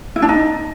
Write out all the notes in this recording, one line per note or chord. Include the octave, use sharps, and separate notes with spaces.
E4
D4
D#4